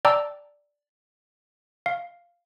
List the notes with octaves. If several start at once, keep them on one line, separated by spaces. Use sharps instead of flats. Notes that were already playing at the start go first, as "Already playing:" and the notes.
D5 G5 A5 A#5 D6 E6
F5